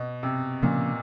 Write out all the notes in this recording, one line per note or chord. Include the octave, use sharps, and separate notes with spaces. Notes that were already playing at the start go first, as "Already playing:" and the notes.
Already playing: B2
C3
A#2 C#3 F3 A#3 C#4